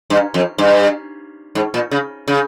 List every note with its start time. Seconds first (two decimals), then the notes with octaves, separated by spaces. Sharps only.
0.10 G2
0.34 F2
0.58 G2
1.55 G#2
1.74 A#2
1.91 C#3
2.28 C#3